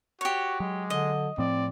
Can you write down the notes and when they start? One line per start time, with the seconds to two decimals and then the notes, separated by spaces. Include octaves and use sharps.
0.21 F#4 G4 C#5
0.60 F#3 G#3
0.90 D3 D#5
1.38 A2 F3 C4 D5